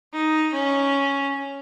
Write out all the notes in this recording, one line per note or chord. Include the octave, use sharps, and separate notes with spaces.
D#4
C#4